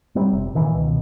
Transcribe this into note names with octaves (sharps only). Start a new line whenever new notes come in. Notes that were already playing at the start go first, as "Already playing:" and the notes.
F#3 G3 C4
F1 C3
A#2 D#3 E3
C#2 B2 D#3